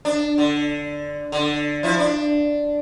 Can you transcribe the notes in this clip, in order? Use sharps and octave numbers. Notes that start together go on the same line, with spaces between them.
D4
D3
D3
F3 E4
D4